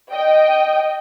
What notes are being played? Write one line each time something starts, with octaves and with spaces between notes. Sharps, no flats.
D#5 G5